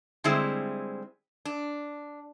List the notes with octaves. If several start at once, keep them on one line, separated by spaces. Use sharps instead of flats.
D3 G3 G#3 C4 E4
D4